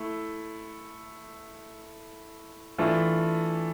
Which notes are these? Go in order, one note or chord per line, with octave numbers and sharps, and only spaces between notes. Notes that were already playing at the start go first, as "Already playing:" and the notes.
Already playing: A3 E4
E3 A3 D4 F4